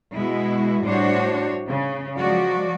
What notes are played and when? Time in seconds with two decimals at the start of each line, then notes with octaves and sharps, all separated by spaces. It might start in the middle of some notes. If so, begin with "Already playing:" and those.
0.18 B2 G#3 E4 F#4
0.86 A2 G3 D4 F#4 C5 C#5
1.69 C#3
2.18 F3 F#3 G#3 F#4 D5